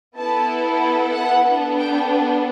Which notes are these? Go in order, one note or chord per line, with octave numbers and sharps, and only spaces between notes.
B3 E4 A4 A5
F#5
B3 D4 A4
G5